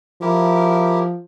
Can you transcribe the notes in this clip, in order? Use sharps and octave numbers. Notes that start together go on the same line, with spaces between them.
F3 E4 G4 A#4